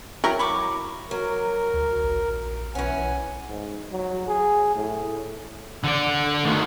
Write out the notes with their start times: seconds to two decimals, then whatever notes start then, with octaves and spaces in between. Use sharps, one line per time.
0.24 F#3 E4 A#4 C#5 G5 A#5
0.39 B5 C#6 D6
1.11 F#3 A#4
1.74 D2
2.04 A#1
2.75 B1 E3 C#4 F#5 G#5
3.49 G#2
3.92 F#3
4.28 G#4
4.75 A2
5.84 D3 D5
6.44 D2 D#3